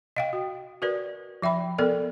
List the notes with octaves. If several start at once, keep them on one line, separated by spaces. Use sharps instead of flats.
D#5 F5 G5
F#4
F#4 A#4 B4 D5
F3 E5 G5 B5
B3 A4 A#4 D5